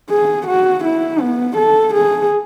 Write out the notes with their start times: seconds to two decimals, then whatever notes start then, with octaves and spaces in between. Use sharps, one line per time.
0.10 G#4
0.48 F#4
0.84 E4
1.20 B3
1.57 A4
1.94 G#4